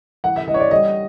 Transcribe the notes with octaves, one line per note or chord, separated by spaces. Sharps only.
E3 F#5
E5
E3 D#5
C#5
D5
G3 D#5